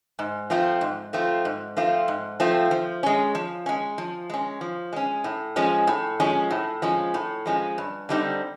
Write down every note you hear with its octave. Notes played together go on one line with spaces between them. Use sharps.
G#2
F3 A3 C4 F4
G#2
F3 A3 C4 F4
G#2
F3 A3 C4 F4
G#2
F3 A3 C4 F4
F3
G#3 C#4
F3
G#3 C#4
F3
G#3 C#4
F3
G#3 C#4
A2
F3 G#3 C#4
A2
F3 G#3 C#4
A2
F3 G#3 C#4
A2
F3 G#3 C#4
G2
D3 G3 C4 D#4